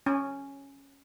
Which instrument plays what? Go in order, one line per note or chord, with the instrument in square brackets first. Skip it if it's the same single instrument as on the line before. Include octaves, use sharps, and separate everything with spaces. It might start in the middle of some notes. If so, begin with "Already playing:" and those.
[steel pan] C#4